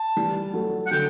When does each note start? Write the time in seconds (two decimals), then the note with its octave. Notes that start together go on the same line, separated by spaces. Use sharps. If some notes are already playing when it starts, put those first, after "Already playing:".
Already playing: A5
0.17 E3 G3
0.54 F#3 A3
0.86 F#5
0.91 D3 F#3 G5